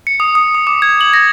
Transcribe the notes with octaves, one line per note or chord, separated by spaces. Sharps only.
C#7
D#6
D#6
D#6
D6
G#6
F#7
A#6